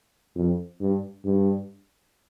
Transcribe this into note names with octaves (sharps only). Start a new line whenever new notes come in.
F2
G2
G2